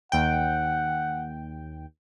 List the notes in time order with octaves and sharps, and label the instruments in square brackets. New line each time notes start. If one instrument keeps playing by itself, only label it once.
[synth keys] D#2 G5 [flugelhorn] F#5